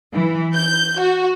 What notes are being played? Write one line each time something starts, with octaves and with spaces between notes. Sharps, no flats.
E3
G6
F#4